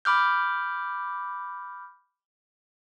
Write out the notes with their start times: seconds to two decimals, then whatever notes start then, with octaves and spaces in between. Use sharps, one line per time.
0.05 B5 D6 F6 G6